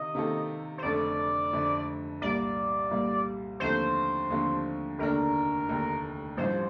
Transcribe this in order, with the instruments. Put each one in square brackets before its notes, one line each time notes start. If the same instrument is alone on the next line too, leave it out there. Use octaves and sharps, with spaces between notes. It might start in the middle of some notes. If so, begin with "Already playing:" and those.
Already playing: [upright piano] C3 D#3 A#3 D#4 [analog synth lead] D#5
[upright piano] C3 D#3 A#3 D#4 A4
[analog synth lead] C5
[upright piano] F1 F2 D3 A3 [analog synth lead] D5
[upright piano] F1 F2 D3 A3
[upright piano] C2 A#2 G3 A#3 [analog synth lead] D5
[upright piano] C2 A#2 G3 A#3
[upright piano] D#2 D3 F3 A3 C4 [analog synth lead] C5
[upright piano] D#2 D3 F3 A3 C4
[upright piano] F1 D#2 D3 A3 D4 [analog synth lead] A#4
[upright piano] F1 D#2 D3 A3 D4
[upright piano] A1 G2 F3 [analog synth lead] C5